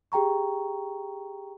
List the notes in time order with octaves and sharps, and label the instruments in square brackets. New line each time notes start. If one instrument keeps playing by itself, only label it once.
[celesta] G4 G#4 G5 A#5 C#6